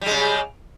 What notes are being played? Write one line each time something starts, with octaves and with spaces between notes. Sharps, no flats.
C#3 G3 G#3